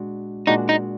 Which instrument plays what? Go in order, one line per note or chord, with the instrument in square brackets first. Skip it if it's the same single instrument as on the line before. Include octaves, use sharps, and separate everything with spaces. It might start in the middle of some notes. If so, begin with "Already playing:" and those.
Already playing: [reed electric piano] A#2 G#3 D4 F#4
[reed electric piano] A#2 G#3 D4 F#4 [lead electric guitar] D#4
[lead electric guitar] D#4